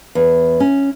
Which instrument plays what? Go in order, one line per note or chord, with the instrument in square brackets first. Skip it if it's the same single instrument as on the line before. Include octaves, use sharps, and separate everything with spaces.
[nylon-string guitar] E2
C#4